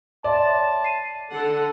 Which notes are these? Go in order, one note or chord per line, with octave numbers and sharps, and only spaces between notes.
C#5 D5 E5 A5 C6
C7 D#7
D3 A4 F#5